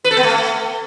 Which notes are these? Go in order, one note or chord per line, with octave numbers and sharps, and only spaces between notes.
B4
A4
B3
A3